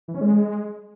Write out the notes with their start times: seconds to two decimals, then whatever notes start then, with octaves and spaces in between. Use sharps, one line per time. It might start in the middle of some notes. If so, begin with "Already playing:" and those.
0.08 E3
0.15 C#4
0.21 G#3